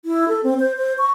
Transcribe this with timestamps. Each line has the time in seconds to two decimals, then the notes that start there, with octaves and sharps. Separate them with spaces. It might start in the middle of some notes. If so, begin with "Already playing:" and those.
0.05 E4
0.28 A4
0.44 C4
0.60 C5
0.77 C5
0.98 C#6